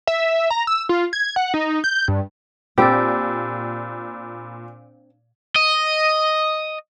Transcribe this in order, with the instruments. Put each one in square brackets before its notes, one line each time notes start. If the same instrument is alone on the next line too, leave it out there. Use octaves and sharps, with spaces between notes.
[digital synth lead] E5
A#5
E6
F4
G#6
F#5
D#4
G6
G2
[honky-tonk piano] A#2 [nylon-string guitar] C4 D4 [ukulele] G4 [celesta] B5 E6 A6
[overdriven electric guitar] D#5